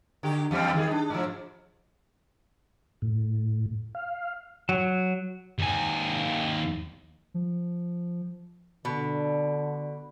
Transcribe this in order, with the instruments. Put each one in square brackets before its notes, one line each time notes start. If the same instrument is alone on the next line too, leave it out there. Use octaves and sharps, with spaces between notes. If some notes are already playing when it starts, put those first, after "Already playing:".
[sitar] D3 G4
E2 G3 C4
D#3 G3 G#4
D4
G#2 F3
[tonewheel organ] A2
F5
[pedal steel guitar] F#3
[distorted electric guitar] D#2 G#5
[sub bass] F3
[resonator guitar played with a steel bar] B2 [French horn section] D3